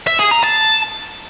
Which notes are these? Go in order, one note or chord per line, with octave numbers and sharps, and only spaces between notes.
E5
G#4
A#5
A5